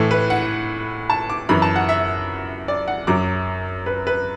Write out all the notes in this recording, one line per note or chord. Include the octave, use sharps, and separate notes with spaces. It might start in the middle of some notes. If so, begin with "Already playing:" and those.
Already playing: A2 E3 A4
B4
F#5
A5
D6
F#2 E3 B5
A5
F#5
E5
D5
F#5
F#2 F#3 D6
B4
B4